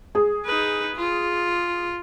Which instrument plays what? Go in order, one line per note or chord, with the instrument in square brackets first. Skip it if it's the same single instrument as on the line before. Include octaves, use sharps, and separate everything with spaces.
[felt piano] G#4
[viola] D#4 B4
F4